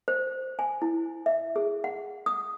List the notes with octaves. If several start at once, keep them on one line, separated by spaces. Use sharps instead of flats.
C5
G#5
E4
E5
G#4
F#5
D#6